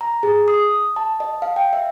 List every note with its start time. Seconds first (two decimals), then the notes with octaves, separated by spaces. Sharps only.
0.01 A#5
0.23 G#4
0.48 D#6
0.96 A5
1.20 D#5
1.42 F5
1.56 G5
1.73 E5